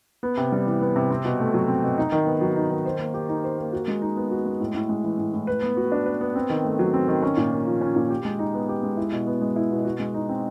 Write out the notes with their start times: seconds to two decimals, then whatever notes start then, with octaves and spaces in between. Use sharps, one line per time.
0.23 B3
0.37 C3
0.52 G3
0.67 E3
0.81 B3
0.96 C3
1.10 C4
1.25 B2
1.39 A3
1.54 F#3
1.68 C4
1.83 B2
1.98 D#4
2.12 D#3
2.27 B3
2.41 F#3
2.56 D#4
2.70 D#3
2.85 C5
2.99 A#3
3.14 G4
3.29 D#4
3.44 C5
3.58 A#3
3.73 F#4
3.88 G#3
4.02 D#4
4.17 B3
4.31 F#4
4.46 G#3
4.60 A2
4.74 A2
4.89 G#3
5.04 E3
5.18 A2
5.34 A2
5.47 B4
5.62 B3
5.77 F#4
5.92 D4
6.06 B4
6.21 B3
6.35 C4
6.50 D#3
6.64 A3
6.79 F#3
6.94 C4
7.08 D#3
7.23 C#4
7.37 A#2
7.52 A#3
7.67 F3
7.81 C#4
7.96 A#2
8.10 G4
8.25 G#3
8.39 D#4
8.54 B3
8.69 G4
8.83 G#3
8.97 E4
9.12 B2
9.27 B3
9.41 G#3
9.56 E4
9.71 B2
9.85 F#4
10.00 G#3
10.14 D#4
10.29 C4